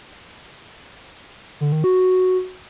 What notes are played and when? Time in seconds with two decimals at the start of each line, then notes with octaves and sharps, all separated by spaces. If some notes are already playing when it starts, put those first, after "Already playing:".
1.61 D3
1.72 D#3
1.84 F#4